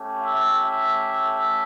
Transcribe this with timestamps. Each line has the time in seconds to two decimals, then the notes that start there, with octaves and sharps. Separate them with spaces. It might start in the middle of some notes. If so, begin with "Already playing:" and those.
Already playing: A3 C#4 G4
0.22 E5
0.62 E5